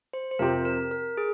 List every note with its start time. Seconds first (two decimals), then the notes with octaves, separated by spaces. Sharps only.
0.13 C5
0.31 C5
0.39 F2 C3 F3 C4 G4 A#4
0.65 A#4
0.91 A#4
1.17 G#4